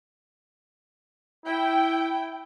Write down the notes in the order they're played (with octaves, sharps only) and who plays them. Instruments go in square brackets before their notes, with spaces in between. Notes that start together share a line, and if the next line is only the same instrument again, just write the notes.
[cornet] E4 [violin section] G5